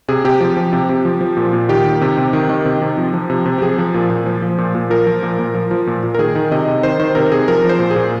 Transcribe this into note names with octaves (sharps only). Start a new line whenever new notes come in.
C3 G#4
C3 G4
F3
F3
C3
C3
F3
F3
A#2
A#2
D#3 G4
D#3
C3
C3
D#3
D#3
C3
C3
F3
F3
C3
C3
G4
F3 G#4
F3
A#2
A#2
F3
F3
A#2
A#2
F3 A#4
F3
A#2
A#2
F3
F3
A#2
A#2
A#4
D#3 G#4
D#3
C3 D#5
C3
D#3 C5
D#3 C5
C3 A#4
C3 G#4
F3 A#4
F3
C5
A#2
G#4
A#2